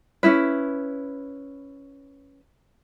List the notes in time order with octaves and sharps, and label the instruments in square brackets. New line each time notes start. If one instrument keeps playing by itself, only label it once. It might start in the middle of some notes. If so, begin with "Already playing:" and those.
[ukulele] C#4 D#4 E4 B4